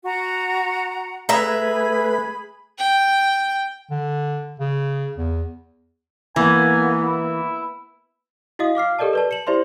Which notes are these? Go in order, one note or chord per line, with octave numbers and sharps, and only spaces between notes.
F#4 F#5 A#5
A3 G#4 B4 E5 A#5 B5
G5
D3
C#3
E2
E3 A#3 B3 G#5
E4
E4 F#4 D#5 F5 D#6
F5 D6 F6 C7
G4 A4 A#4 D5 D#5 A5
B4 D5 A5
C#7 E7 F#7
E4 G4 C5 D5 E5 C6